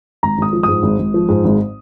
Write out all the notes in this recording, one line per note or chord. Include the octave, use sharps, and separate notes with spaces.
G#1 A#5
G#1 D#6
F3
D#6
G#2
G#1
G#1
F3
G#2
G#1